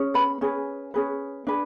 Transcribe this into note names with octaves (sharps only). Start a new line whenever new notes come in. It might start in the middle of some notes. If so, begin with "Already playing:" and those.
Already playing: C#4 G#4
B4 B5
C#4 G#4 B4
C#4 G#4 B4
D4 G#4 B4